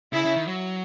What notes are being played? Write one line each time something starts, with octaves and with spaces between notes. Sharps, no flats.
C#3 E4
C#3
D#3
F#3